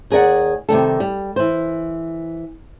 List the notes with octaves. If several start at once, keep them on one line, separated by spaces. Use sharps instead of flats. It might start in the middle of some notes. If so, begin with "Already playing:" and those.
D#2 G#4 A#4 D5 F#5
C3 D#3 G3 A4
G3
E3 C5